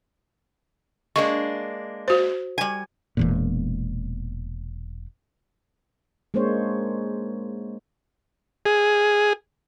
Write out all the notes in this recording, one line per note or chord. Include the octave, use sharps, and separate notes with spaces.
G#3 A#3 D4 C#6
F#4 C5
G3 G#5
E1 E2 A#2
G#3 A#3 D4 C5 C#5
G#4